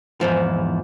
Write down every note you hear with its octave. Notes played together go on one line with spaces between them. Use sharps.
E2 G#2 F3